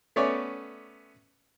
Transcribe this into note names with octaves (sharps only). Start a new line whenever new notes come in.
A3 B3 C#4 C#5 D5